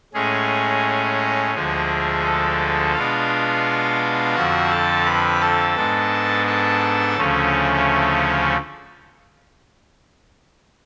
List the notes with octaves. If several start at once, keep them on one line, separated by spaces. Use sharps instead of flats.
A2 G#3 C#4 G#4
D2 D3 F3 G#3 G#4
A4
B2 G#3 B3 D4 F4 F5
F2 D3 F3 F#4 F#5
A4 A5
B4 B5
A4 A5
G#2 G#3 B3 D4
A4 A5
D2 C#3 F3 A3 C#4